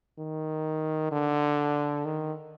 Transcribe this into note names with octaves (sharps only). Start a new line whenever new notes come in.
D#3
D3
D#3